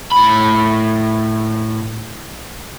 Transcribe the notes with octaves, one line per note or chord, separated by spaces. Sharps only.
A2 B5